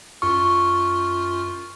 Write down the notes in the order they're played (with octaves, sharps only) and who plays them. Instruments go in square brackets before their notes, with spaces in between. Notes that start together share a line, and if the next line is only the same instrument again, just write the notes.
[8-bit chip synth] F#2 F4 F6 [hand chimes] C#6